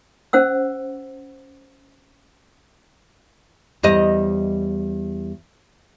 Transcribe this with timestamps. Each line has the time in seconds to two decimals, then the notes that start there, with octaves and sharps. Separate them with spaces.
0.33 C#4 C5 F#5 E6
3.83 E2 G3 D#5